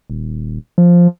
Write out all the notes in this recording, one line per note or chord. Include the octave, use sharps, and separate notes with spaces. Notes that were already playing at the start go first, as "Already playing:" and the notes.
D#1
F3